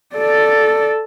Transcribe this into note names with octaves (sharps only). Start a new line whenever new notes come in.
A4 D5